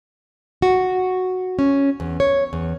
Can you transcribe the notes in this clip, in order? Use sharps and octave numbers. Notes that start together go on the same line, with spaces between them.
F#4
C#4
E2
C#5
E2